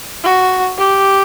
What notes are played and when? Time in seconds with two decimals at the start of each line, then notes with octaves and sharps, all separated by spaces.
0.24 F#4
0.78 G4